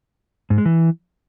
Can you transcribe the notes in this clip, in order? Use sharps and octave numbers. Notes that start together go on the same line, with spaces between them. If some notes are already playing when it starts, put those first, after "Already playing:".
G#2
G#3
E3